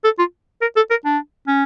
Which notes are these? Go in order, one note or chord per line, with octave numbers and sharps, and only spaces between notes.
A4
F4
A#4
A4
A#4
D4
C#4